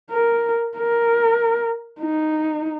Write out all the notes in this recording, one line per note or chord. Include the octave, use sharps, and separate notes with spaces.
A#4
A#4
D#4